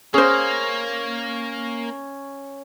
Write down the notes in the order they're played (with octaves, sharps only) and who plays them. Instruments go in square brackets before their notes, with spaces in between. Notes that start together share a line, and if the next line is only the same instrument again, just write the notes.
[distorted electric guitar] A#3 [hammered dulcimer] C#4 [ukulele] G#4 C5